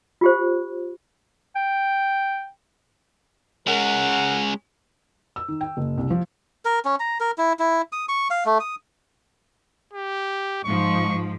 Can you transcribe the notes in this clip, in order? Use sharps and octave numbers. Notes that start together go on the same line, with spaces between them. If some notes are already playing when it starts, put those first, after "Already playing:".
F4 G4 C5
G5
G#3 C#4 A#4 F#5
E6
D#3
G5
F#1
C2
F3
A#4
C#4
A#5
A#4
E4
E4
D#6
C#6
F5
A3
D#6
G4
G#2 F3 C#6